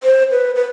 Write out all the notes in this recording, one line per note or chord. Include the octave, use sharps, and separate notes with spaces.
C5
B4
B4